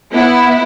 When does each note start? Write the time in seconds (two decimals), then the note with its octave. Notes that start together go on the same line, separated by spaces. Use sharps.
0.13 B3 E4